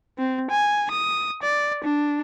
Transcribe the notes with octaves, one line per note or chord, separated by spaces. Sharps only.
C4
G#5
D#6
D5
D4